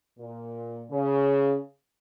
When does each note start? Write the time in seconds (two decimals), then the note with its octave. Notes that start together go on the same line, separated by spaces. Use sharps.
0.19 A#2
0.91 C#3